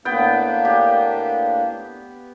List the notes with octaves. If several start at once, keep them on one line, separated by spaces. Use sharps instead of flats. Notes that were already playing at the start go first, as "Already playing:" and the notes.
A2 A#3 B3 D4 G5
G4